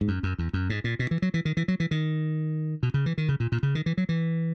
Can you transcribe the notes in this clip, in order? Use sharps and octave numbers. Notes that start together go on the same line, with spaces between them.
G#2
F#2
F#2
E2
F#2
G#2
A#2
B2
E3
F#3
E3
D#3
E3
F#3
E3
D#3
B2
C#3
E3
D#3
C#3
A#2
A#2
C#3
D#3
E3
F#3
E3